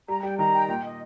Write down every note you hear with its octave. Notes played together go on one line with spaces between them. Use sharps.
G3 A#5
G3 G5
D#3 A#5
G5
A#2 G5
D#5